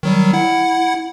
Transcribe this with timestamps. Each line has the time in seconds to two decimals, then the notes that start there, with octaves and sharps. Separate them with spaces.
0.03 D#3 F#3 G3
0.33 E4 F#5